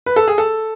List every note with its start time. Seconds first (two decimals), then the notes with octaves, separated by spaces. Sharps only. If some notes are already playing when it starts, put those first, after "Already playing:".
0.06 B4
0.16 A4
0.28 G#4
0.38 A4